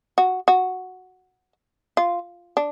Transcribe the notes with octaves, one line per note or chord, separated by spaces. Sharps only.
F#4
F#4
F4
D4